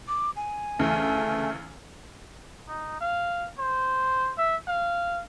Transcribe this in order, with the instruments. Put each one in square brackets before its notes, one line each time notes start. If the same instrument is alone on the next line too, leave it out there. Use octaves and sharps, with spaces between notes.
[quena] D6
G#5
[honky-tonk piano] D2 C#3 E3 [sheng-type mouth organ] A3
[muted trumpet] D#4
F5
C5
E5
F5